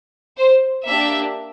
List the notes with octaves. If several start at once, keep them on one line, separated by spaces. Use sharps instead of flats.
C5
A#3 D4 G4 E5